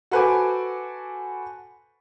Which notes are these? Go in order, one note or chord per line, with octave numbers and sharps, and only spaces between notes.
F#4 A4 B4 C5 G#5 D6